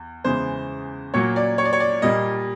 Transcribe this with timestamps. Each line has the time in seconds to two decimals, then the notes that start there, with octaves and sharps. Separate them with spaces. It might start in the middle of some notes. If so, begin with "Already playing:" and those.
Already playing: E2
0.24 E2 C#3 E3 G#3 C5
1.14 A#2 F#3 A#3 C#5
1.36 D5
1.58 C#5
1.65 D5
1.73 C#5
1.80 D5
2.02 A#2 G3 A#3 D#5